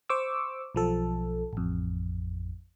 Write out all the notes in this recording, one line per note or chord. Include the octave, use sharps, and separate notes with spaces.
C5 C#6 D6 E6
B1 F3 A4
A1 F2